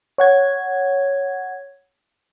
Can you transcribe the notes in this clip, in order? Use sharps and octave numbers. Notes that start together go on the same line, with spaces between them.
C#5 F#5 G#6